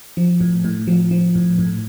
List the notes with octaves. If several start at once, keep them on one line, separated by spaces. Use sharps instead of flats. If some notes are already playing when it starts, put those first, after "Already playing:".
F3
A2
A2
F3
F3
A2
A2